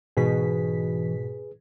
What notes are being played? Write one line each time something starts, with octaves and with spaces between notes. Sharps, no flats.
G#2 B2 E3 G#4 B4 B6